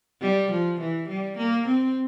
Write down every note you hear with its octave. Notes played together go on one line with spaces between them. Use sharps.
G3
F3
E3
G3
A#3
C4